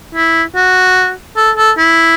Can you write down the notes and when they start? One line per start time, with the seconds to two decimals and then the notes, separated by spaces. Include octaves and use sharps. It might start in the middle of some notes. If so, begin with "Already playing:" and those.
0.15 E4
0.56 F#4
1.37 A4
1.57 A4
1.78 E4